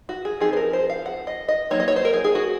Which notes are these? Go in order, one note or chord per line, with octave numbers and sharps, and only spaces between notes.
F#4
G#4
F3 C4 D#4 G#4
C5
A#4
C5
F5
F#5
D#5
D#5
F#3 A#3 D#4 C#5
D#5
C#5
C5
A#4
G#4
G#4
F#4